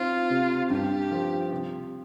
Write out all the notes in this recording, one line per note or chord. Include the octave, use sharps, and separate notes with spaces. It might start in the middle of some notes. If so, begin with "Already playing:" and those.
Already playing: C4 D#4 F4
C3
G2 G4
F3
C3